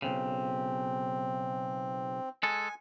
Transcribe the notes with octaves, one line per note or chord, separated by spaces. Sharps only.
B1 F2 C#3 C4
G#3 A4 G#5